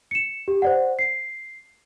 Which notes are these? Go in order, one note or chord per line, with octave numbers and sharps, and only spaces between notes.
C#7 E7
G4
C5 D5 F#5
C7